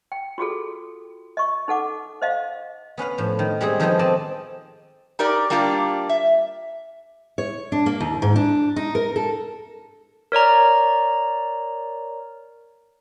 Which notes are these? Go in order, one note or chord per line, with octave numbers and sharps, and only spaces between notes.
G5
F4 F#4 G#4 A4
D#5 C#6
D#4 A4 F#5 D6
C5 D#5 F5
B3 C#4 B4 F5
A2 F3
D#3
G3 G#3 C4 G#4
D#3 F3 B3 G#4 A4 C5
C4 D5 D#5 A5
D#4 G4 A#4 D5
G3 A#3 D4 F4 G4
E5
C#5
D4
A#3
D#2
G#2
D4
D#4
A#4
A4
A#4 C#5 D5 A#5